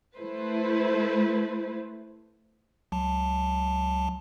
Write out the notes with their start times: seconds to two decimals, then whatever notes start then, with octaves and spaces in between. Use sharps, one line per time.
0.16 A3 E4 B4 C5
2.92 C#2 F#3 A5